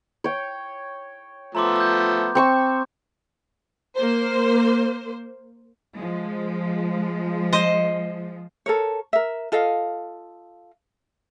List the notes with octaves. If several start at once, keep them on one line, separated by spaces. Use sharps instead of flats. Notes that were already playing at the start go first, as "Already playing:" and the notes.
C#5 G5
F3 A3 B3 A#5 C6 D6
D6 G6
C4 C#6 E6 G6
A#3 C5
F3 G#3
C5 D#5
A4 A#4 C#5
A#4 E5
F4 A4 D#5 F5